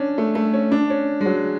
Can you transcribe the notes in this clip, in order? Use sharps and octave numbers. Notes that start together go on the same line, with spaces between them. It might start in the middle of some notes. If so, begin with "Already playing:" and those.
Already playing: C#4 D4
A3
A3
C#4
D4
C#4
G#3
F#3